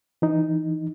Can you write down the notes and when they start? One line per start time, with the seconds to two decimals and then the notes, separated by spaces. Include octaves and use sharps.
0.22 E3 D#4